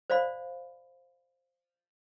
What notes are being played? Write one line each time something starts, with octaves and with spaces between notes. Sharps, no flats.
C5 D5 F5 B5